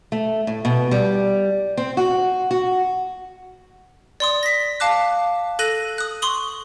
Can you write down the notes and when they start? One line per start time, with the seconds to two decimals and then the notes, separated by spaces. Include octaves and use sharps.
0.12 A3
0.47 A2
0.65 B2
0.91 G3
1.77 C4
1.97 F#4
2.51 F#4
4.20 D5 C6 D#6
4.43 A#6 B6
4.80 F5 A5 D6 F#6
5.59 A4 F#6 A#6 D#7 F#7
5.98 D#6 F#6
6.22 C6 C#6 D#6 F#7 G7